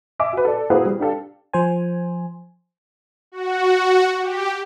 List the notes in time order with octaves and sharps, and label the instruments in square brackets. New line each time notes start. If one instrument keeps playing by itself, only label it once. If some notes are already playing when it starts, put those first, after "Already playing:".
[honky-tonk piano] D#5 E5 G#5 D6
F#4 B4
A4 D5
A#3 C4 E4 F#4 G#4 B4
G3
D4 G4 A4 F5
[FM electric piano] F3 C5 G#5
[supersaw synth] F#4
G4